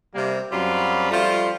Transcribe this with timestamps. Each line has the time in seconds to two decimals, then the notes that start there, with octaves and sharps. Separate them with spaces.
0.15 C3 G3 A#3
0.52 F#2 F#3 G3 C4 F4 B5
1.11 F3 G3 A3 F4